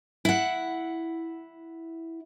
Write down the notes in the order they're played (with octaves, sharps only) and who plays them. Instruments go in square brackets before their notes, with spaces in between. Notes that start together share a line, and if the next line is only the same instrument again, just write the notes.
[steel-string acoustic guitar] E4 F#5